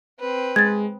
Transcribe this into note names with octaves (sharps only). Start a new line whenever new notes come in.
C4 B4
G#3 G#6 A6